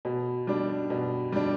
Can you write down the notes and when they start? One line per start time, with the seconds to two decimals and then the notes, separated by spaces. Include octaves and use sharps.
0.05 B2
0.47 G3 D4
0.90 B2
1.32 G3 D4